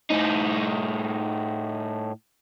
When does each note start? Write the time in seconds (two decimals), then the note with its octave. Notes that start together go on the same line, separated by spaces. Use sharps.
0.10 A2 D#4